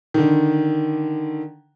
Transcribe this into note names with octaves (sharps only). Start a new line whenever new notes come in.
D3 D#3